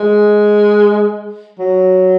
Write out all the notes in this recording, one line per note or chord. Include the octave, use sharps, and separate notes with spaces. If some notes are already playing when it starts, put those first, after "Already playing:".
Already playing: G#3
F#3